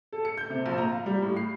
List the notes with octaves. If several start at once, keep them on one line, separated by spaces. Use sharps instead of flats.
A4
C#7
G6
C3
A#1
A#5
F5
G3
A2
C7